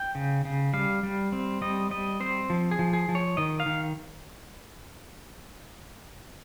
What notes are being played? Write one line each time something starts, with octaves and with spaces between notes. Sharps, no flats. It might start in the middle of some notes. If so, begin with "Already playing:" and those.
Already playing: G5
C#3
C#3
G3 F5
G3
C4
G3 D#5
G3 D#5
C4 C5
F3
G#4
F3
G#4
F3
C#5
D#3 D#5
F5
D#3